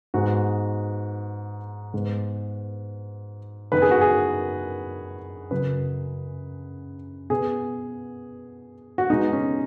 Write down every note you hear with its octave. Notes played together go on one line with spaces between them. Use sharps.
G#2 G#3 B3 F#4
G#2 G#3 B3
F#2 D#3 B3 B4
G#4
F#4
G#4
F#2 C#3 F#3 B4
B2 B3 G#4
F#4
B2 G#3 B3 D#4
C#4